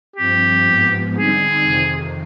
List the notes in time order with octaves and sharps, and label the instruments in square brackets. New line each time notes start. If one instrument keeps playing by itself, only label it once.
[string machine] G2 F3 C4 [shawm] G4
[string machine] G#2 F3 B3
[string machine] D3 G3 C4 D#4 [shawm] G#4
[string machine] F2 C3 D#3